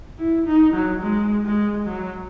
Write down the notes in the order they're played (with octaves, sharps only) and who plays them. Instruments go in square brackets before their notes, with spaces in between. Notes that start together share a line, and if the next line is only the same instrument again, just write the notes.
[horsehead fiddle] E4
D#4
F#3
G#3
G#3
F#3